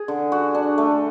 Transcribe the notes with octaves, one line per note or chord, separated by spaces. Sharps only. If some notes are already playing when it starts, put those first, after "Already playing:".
Already playing: G#4
D3
F#4
D4
A3